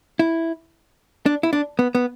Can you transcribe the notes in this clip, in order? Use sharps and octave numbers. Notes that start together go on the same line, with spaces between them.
E4
D4
E4
D4
B3
B3